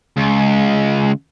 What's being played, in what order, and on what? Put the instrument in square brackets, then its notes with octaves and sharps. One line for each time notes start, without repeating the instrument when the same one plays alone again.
[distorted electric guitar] C#2